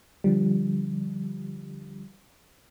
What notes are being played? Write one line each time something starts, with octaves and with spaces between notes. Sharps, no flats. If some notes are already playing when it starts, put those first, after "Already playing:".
D3 F3 G3